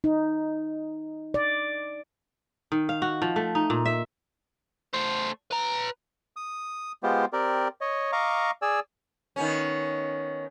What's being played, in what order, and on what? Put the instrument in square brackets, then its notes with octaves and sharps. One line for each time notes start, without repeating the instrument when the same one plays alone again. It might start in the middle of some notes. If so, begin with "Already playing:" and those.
[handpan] D#4
D5
[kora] D#3
F5
F#4
F3
A3
D#4
A#2
E5
[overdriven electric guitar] A3 C5
B4 A#5
[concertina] D#6
G#3 B3 F4 G4 C5
C4 G4 A#4 D5
C#5 D#5
D#5 F5 A#5 C#6 D6
G#4 D5 G#5 E6
[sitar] D#3 B3 C#4